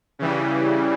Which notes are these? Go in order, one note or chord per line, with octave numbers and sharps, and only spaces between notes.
C#3 E3 G3